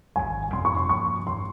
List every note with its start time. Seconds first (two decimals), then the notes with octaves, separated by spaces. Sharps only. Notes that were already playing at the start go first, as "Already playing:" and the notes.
0.16 G#1 G2 G3 C#4 G#5
0.53 F2 C3 G3 C4 C6
0.65 C#6
0.77 C6
0.89 G2 F3 A#3 C#4 C#6
1.26 E3 G3 C6